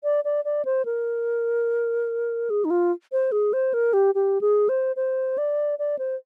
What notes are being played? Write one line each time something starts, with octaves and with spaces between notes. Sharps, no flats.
D5
D5
D5
C5
A#4
G#4
D#4
F4
C5
G#4
C5
A#4
G4
G4
G#4
C5
C5
D5
D5
C5